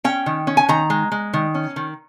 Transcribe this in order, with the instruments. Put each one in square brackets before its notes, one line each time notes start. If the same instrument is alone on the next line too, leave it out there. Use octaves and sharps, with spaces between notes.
[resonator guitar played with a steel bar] C#4 G5
D#3
C#4
G#5
D#3 A#5
G#3
G#3
D#3
C#4
D#3